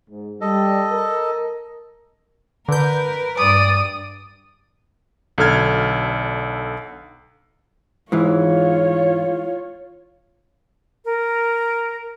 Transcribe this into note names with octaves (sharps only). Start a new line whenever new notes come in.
G#2
G3 A4 D#5
A#4
D3 A#4 B4 G6
G2 D5 D#6
B1 D3 A4 F6 G#6
G#2 E3 F4 C#5
A#4